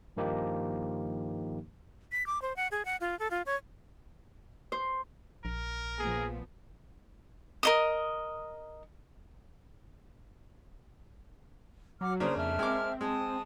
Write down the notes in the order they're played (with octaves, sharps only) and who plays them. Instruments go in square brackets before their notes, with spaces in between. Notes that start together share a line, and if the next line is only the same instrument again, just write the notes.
[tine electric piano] G2 D#3 F3 A#3 D#4 G4
[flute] B6
D6
C5
F#5
G#4
F#5
F4
A4
F4
C#5
[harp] C5
[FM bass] A#1 [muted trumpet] A#4
[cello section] A#2 F3 B3 [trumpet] G#4
[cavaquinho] A#4 D#5 D#6
[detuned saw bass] F#3 [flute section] F#5 D6 F6
[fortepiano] C#3 A#3 D4 [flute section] C5 A#5 D#6
[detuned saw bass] F2 [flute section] E5 A5 F6
[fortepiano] G#3 A#4 D6 [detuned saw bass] C4
[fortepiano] G#3 [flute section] A5 D#6